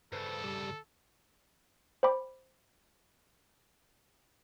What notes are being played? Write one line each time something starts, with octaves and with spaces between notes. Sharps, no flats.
G2 C#3 A4 B4 C5
G3 G4 A5
C5 D5 G5 B5 D6